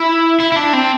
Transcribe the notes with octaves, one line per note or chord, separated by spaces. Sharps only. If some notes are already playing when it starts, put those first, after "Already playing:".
Already playing: E4
E4
E4
D4
C4